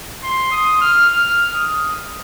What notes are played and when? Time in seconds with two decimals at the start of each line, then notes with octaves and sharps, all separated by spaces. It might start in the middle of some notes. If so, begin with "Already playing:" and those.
0.23 C6
0.52 D#6
0.81 F6
1.09 F6
1.54 D#6